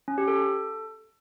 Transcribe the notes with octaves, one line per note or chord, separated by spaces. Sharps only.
C#4
G4
A4